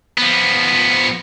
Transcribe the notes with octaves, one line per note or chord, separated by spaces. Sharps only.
F3 B3